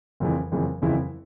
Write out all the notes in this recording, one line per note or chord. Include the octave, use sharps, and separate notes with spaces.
F#1 F2 C#3 E3
F#1 F2 C#3 E3
F#1 F2 C#3 E3 E4